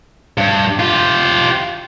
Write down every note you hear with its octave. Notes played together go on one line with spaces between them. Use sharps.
G2
F4 G4